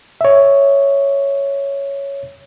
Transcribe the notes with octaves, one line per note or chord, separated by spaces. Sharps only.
C#5 E5